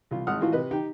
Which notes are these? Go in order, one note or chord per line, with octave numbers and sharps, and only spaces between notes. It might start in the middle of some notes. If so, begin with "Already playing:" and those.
C2 F4
G#1 F#5 D#6 F6
A2 E3 F4 F#4
C3 B4 D#5
D#4 G4 G5